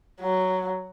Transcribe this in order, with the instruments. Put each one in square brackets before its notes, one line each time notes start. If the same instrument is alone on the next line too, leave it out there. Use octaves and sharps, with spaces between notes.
[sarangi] F#3